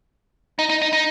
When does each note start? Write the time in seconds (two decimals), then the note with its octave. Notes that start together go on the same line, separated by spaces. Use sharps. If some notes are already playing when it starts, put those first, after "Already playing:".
0.59 D#4
0.69 D#4
0.82 D#4
0.93 D#4